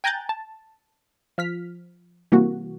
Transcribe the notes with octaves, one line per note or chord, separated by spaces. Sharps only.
G5 G#5 A#5 F#6 G6 A6
A5
F3 F6 B6
C3 E3 G3 A#3 F#4